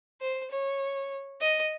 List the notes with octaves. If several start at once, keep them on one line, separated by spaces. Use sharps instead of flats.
C5
C#5
D#5